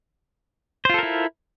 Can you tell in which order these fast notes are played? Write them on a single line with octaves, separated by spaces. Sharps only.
C5 F4 A4 A#4 E4